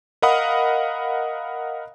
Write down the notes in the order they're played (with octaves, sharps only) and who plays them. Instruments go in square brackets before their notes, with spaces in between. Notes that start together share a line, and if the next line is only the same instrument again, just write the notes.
[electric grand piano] A#4 D#5 F5 F#5 B5 D#6